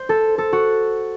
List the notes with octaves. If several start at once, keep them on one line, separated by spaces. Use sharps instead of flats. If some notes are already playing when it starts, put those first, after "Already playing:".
Already playing: C5
A4
A4
F#4